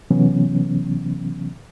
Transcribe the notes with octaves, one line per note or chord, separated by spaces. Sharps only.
C3 E3 F#3 B3 C#4